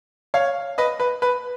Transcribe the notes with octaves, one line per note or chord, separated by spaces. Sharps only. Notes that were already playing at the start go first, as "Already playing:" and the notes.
C#5 F5
B4 D#5
B4
B4